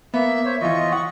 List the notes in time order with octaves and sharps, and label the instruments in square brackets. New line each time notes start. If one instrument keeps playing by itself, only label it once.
[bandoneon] A#3 [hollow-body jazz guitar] B3 [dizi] E5
[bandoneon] C5 C#5
[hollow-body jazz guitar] E2 E3 [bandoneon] F4 D#5 [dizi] C#6
[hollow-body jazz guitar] F#5